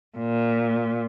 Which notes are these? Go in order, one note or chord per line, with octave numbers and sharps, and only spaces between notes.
A#2